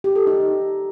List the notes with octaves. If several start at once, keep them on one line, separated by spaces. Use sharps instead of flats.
G4
A4
D#4